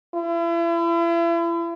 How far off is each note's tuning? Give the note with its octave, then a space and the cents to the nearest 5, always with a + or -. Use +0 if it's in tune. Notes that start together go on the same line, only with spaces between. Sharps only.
E4 +40